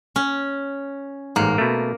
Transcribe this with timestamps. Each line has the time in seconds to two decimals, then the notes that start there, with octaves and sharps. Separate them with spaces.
0.16 C#4
1.36 A1 G#2 A#3
1.58 B2 A3